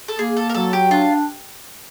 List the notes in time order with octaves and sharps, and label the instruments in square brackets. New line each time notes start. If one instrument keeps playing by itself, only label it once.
[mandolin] A4
[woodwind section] A#3 [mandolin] G#4
[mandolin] A4
A#4
[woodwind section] F#3 [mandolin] A4
[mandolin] G4
[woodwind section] D4 [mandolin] F4